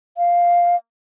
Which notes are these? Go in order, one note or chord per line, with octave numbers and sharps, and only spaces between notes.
F5